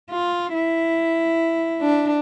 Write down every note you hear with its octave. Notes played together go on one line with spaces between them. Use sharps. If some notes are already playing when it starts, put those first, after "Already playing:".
F4
E4
D4